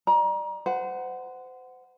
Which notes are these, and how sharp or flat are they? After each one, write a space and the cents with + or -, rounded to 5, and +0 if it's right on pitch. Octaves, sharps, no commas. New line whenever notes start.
D5 +35 A#5 +30
C5 -30 F#5 +5